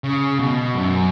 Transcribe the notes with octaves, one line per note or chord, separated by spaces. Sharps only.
C#3
B2
F#2